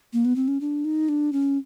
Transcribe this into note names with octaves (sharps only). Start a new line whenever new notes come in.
A#3
B3
C4
C#4
D4
D#4
D4
C#4